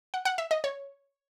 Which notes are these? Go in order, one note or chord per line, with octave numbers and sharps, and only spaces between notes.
F#5
F#5
E5
D#5
C#5